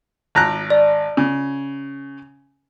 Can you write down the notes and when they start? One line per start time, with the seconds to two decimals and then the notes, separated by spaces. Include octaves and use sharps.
0.35 G#1 A#5 F#6
0.70 D5
1.17 C#3